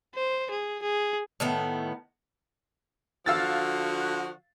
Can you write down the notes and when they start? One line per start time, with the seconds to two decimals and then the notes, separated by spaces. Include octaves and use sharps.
0.15 C5
0.50 G#4
0.82 G#4
1.40 A2 D#3 B3
3.26 D3 F3 F#4 F5 E6 A6